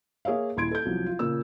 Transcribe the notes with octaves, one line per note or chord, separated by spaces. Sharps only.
A#3 G#4 C#5 E5 F5
D#1 E4 C6 G#6 D7
A4 G6
C2 F3 F#3
F4
A#2 C#3 A#3 E6